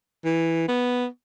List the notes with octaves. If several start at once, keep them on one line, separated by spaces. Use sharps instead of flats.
E3
B3